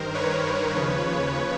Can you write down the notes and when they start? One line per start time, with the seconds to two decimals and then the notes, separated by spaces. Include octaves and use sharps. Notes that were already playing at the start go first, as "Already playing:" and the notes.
Already playing: G2 D#3 A#4 C5
0.14 B4 C#5
0.74 D#2 C#3 F3